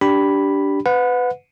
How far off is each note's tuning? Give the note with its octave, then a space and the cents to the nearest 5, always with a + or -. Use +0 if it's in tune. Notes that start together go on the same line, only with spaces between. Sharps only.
D4 -15 G4 -10 B5 +0
B4 +20 F#5 -30